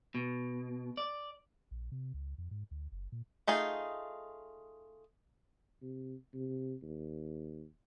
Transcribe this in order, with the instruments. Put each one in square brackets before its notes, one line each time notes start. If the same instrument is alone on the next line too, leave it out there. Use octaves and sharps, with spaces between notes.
[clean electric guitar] B2
D5
[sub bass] A#1
C3
C#2
F2
G#2
D2
F#1
A#2
[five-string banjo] A3 D#4 F4 G#4
[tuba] C3
C3
D#2